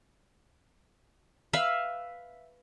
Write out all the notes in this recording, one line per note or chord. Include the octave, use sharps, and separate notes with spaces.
B4 E5 F5